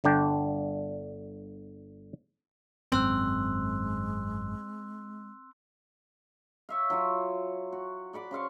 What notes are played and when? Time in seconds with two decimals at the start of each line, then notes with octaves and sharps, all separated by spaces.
0.04 G1 D3 D4 G5
2.92 G#1 F#2 G#3 C4 C6 E6 F#6
6.69 C#5 E5 F5
6.90 F#3 E4 F4 C#5
7.72 F#4
8.13 D5 F#5 B5 D6
8.31 C#3 C5 F5 C#6